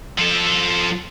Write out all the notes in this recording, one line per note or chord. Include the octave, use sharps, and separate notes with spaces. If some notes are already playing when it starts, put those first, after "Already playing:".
F3 A4